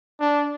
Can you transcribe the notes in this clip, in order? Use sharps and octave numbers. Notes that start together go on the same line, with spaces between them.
D4